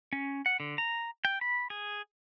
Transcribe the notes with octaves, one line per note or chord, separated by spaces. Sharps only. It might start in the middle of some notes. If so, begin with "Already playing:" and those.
C#4
F#5
D3
A#5
G5
B5
G#4